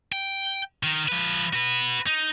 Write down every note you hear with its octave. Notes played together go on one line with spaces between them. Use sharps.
G5
D#3
F3 B4
F#4 B4
D#4